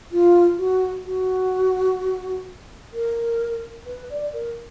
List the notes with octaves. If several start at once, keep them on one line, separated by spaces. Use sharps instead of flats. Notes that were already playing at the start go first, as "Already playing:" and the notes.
F4
F#4
F#4
A#4
B4
D5
A#4